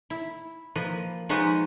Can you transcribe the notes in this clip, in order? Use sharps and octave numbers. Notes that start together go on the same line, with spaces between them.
E4
F3 A#3 B4 D#5
F3 G#3 D#4 F#4 B4 D#5